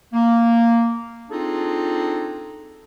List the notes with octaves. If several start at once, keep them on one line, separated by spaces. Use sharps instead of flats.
A#3
C4 D4 D#4 F4 G#4 A4